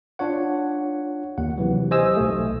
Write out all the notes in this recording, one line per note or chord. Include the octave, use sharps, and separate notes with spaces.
D4 F4 C#5 F#5
D#2 F#5
C3 E3 F#3
G4 C5 D#5 G#5 D#6 E6
B1 A3